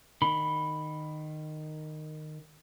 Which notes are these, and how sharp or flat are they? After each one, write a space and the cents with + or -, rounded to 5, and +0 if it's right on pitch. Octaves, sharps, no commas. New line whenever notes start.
D#3 -15 B5 +0